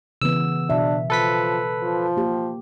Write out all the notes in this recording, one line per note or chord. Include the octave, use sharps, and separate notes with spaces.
C#3 E3 B3 E6
B2 D4 E5
F3 A4 B4 B6
F3
A#3 G4